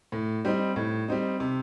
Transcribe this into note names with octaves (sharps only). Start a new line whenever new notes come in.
A2
G3 C4 D#4
A2
G3 C4 D#4
C3